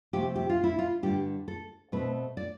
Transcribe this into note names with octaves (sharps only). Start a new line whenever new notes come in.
C3 F3 A3 G4
G4
F4
E4
F4
G2 D3 G3 D4 G4
A4
B2 A3 C4 B4
D5